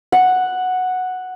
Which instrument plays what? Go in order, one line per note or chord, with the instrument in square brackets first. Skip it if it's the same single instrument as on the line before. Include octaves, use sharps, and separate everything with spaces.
[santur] F#5